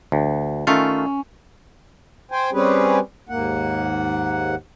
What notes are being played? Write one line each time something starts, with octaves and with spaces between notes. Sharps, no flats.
D2
D#3 A3 C#4 F4
C5 G5 G#5
G3 C4 C#4 G4 G#4 B4
D#2 G#2 A#3 F#5